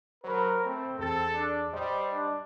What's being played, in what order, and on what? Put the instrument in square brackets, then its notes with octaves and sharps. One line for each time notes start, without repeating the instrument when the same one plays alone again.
[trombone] F#3 [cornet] A#4 [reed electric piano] C5 B5
[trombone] A3 [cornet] C4
[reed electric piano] E2 G#4 A6 [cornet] C4 [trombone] A4
[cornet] D4
[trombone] G3 [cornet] C5 [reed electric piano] D#5
[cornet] D4